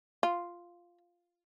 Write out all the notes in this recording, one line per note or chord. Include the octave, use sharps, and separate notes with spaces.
F4